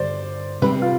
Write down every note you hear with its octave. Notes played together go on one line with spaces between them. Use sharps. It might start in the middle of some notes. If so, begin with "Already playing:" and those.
Already playing: G2 D3 G3 C5 D5
C3 G3 C4 B4
F4